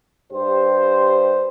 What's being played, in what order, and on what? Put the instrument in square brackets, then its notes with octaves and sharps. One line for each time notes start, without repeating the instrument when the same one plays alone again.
[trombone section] G2 G4 C5